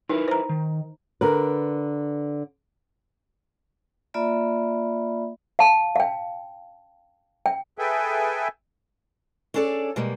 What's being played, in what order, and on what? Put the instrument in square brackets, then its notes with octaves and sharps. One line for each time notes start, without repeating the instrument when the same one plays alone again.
[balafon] D#4 [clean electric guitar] E4 A#4 B4
[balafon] C5 A#5
[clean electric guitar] D#3
[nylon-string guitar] D3 A#4 B4
[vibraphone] A#3 F4 D5 E5 B5
[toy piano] F5 A5
F5 G5
G5
[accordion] G#4 A4 B4 E5 G5 G#5
[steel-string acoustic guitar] C#4 D4 G#4 A4 B4 D5
B2 G3 G#3 A#3